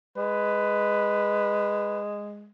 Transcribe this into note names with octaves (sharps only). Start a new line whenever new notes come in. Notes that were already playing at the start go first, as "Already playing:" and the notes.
G#3 B4